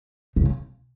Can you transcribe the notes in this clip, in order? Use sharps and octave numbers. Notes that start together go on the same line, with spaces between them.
C#3